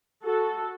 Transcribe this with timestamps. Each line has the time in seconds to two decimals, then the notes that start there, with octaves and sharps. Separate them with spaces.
0.23 F#4 A4